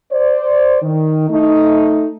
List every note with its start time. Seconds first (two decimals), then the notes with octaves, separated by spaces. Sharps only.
0.12 C5 D5
0.82 D#3
1.30 A3 D#4